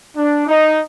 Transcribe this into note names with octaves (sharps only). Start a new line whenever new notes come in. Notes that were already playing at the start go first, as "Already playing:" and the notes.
D4
D#4